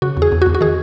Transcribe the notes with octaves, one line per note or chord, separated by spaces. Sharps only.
C#3 F#4
E2
G#4
E2
F#4
E2
F#4
D#3 G#4